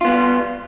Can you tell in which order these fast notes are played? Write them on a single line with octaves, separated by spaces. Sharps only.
F4 B3 G3